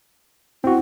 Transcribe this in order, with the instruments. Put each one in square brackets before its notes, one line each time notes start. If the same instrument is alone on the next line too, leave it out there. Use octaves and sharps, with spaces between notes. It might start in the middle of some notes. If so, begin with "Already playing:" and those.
[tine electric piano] C4 F#4 [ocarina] E4